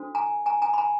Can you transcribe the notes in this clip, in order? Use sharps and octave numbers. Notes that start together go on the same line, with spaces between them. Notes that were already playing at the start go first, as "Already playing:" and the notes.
Already playing: D4 F#4 A4 C5
G#5 A#5
G#5 A#5
G#5 A#5
B5
G#5 A#5